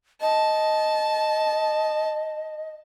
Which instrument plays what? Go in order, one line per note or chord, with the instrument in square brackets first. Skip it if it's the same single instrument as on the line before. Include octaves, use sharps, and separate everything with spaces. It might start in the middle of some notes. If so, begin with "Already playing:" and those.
[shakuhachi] D#5 [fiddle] A5